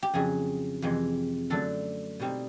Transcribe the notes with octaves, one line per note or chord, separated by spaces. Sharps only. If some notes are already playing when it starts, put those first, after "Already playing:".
G4
F2 C#3 F#3 G#4
F2 C3 E3 G#3
F#2 D3 F#3 A3 D4 A4
B2 G3 C4 D#4